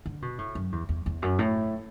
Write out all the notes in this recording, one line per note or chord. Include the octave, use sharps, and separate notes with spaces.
D3
B2
A2
F#2
E2
E2
E2
F#2
A2